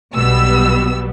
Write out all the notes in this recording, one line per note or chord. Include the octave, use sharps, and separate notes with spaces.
B1 B2 G3 B3 E6